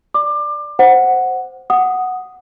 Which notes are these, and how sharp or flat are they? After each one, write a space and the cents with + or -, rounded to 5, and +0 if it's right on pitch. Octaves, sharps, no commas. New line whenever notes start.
D5 +0 D6 +25
C5 +0 F#5 +0
F#5 +0 D#6 +0